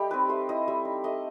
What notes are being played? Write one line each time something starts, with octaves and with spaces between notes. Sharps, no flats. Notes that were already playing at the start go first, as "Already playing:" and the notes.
Already playing: G3 A3 G4 D#5
C4 D#4 B4
A3 C5
E4 D#5
G3 E5
D#4
A3 D#5